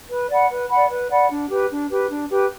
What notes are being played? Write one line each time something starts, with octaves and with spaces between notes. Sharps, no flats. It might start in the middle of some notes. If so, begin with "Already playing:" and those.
B4
D5 F#5 B5
B4
D5 F#5 B5
B4
D5 F#5 B5
D4
G4 B4
D4
G4 B4
D4
G4 B4